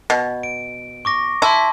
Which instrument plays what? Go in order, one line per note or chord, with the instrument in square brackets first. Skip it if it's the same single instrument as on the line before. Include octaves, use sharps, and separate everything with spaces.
[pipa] B2
[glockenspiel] D7
C#6 D6 A#6
[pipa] E4 [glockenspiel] A5 C6